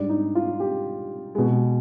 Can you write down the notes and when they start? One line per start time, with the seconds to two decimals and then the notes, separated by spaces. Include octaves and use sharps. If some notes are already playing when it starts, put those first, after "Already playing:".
Already playing: G#2 G3 D4
0.09 D#4
0.35 F4
0.60 G4
1.35 B2 G#3